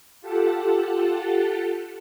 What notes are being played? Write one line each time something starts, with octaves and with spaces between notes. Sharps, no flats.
F4 G4 A4 F#5 A5